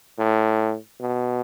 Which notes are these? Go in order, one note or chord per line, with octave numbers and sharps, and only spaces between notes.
A2
B2